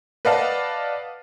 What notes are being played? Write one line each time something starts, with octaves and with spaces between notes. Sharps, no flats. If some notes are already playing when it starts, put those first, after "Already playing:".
B4 D5 D#5 F5 F#5 A5